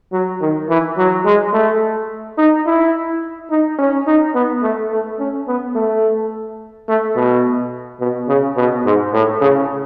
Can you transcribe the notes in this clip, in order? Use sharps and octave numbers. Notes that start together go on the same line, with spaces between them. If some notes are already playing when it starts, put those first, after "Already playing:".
F#3
D#3
E3
F#3
G#3
A3
D#4
E4
D#4
C#4
D#4
B3
A3
A3
C#4
B3
A3
A3
B2
B2
C#3
B2
G#2
A2
C#3